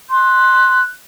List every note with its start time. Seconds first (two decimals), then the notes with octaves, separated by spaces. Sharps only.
0.10 C6 F#6